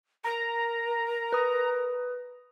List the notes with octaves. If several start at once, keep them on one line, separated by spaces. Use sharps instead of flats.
A#4 A#5
B4 D#6